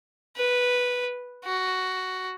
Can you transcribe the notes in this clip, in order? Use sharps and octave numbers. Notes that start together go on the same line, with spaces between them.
B4
F#4